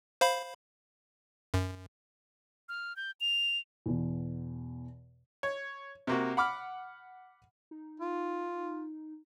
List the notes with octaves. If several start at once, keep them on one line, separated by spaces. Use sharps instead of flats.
C5 F5 B5
F#2
F6
G6
F7
E2 B2
C#5
C3 A#3 F#4
F#5 B5 D6 F6
D#4
F4